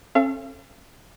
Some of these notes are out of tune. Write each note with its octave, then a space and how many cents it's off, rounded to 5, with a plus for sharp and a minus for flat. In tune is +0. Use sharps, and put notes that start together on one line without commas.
C#4 -45 A4 +0 F5 -40